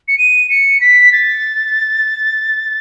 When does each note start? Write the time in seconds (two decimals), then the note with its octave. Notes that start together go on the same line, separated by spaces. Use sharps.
0.08 C#7
0.18 D#7
0.50 C#7
0.81 B6
1.13 A6